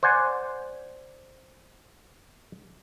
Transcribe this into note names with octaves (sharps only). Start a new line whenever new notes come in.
C5 D5 F#5 G#5